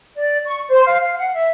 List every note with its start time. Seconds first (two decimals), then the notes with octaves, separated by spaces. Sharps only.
0.16 D5
0.46 C#6
0.69 C5
0.86 F5
1.01 F5
1.18 F#5
1.33 E5